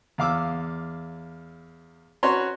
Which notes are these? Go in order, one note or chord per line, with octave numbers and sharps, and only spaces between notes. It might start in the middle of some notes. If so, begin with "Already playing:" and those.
E2 F5 D6 E6
C#4 F#4 B4 C#5 A#5 C6